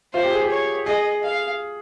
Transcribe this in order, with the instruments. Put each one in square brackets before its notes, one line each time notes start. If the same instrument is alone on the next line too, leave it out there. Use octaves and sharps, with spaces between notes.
[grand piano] F4 [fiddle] C5
[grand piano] G4
G#4
G4
[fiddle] C#5
[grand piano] G#4 [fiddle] D#5
[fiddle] F5